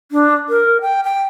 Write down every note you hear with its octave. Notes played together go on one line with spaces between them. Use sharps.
D4
A#4
G5
G5